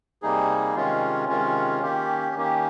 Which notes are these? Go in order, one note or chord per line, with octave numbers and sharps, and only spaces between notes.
C3 G3 A#3 D#4 G#4
C3 D#3 G#3 C#4 F4
C3 D#3 G#3 C#4 F4
D#3 A#3 C#4 G4
D#3 A#3 C#4 G4